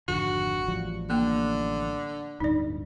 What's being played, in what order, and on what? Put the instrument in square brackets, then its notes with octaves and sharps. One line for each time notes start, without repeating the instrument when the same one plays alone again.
[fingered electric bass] G#1 F2 D3 [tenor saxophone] F#4
[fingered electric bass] A1 F3 G3
[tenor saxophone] D3 [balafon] A#3 G5
[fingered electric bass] D1 G2 [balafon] D#4 D5